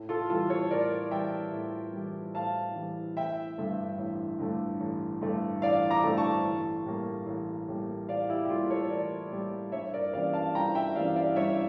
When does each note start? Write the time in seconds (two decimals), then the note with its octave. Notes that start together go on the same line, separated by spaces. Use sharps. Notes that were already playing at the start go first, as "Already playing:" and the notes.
Already playing: A2
0.09 F4 A4
0.29 E3 G3 F4 A4
0.50 A4 C#5
0.71 A2 A#4 D5
1.11 E3 G3 E5 G5
1.52 A2
1.93 E3 G3
2.34 A2 F5 A5
2.75 E3 G3
3.16 A1 E5 G5
3.58 G2 D3 A3
3.98 A1
4.39 G2 D3 A3
4.80 A1
5.21 G2 D3 A3
5.62 A1 D5 F5
5.91 A#5 D6
6.03 G2 D3 A3
6.17 A5 C#6
6.45 A1
6.86 A2 G3 A#3
7.26 A1
7.68 A2 G3 A#3
8.08 A1 D5 F5
8.28 E4 G4
8.45 G4
8.49 A2 G3 A#3 F4
8.70 A4 C#5
8.90 A1 A#4 D5
9.31 A2 G3 A#3
9.72 G2 C#5 E5
9.94 A#4 D5
10.13 E3 G3 A#3 C#4 D5 F5
10.33 F5 A5
10.55 G2 G5 A#5
10.75 E5 G5
10.95 E3 G3 A#3 C#4 D5 F5
11.16 D5 F5
11.36 G2 C#5 E5